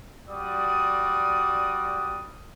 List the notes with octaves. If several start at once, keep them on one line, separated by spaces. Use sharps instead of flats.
G3 F#4 D5 D#6